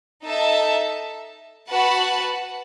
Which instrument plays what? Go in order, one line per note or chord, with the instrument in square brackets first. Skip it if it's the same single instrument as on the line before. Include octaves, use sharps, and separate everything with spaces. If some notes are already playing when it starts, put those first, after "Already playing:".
[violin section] D#4 A4 E5 A5
F#4 B4 F#5 A5